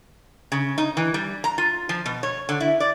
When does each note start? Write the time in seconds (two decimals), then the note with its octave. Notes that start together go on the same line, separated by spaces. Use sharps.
0.52 C#3
0.78 D#4
0.97 E3
1.14 G3
1.44 A#5
1.58 F4
1.89 F3
2.06 B2
2.23 C#5
2.49 D3
2.60 E4
2.80 D5